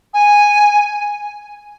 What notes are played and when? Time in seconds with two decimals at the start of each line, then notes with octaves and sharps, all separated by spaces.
0.14 G#5